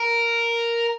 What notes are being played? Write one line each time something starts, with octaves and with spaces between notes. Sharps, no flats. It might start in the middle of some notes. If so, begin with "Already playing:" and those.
Already playing: A#4